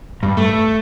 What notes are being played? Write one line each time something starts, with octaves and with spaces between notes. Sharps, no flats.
G2
A3